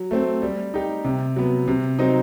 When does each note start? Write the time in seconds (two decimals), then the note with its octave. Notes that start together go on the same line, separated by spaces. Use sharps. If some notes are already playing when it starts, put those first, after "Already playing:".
Already playing: F#3
0.11 A3 C4
0.42 G3
0.74 D#4 G4
1.05 C3
1.36 F#3 B3
1.68 C3
1.99 F#3 C4 D#4